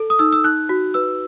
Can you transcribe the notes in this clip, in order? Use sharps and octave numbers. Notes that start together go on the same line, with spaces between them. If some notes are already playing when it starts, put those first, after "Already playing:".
Already playing: A4
D#6
D#4 E6
E6
D#4 F#6
F#4
B4 E6